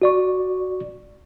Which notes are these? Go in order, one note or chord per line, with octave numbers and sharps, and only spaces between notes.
F#4 D5 C#6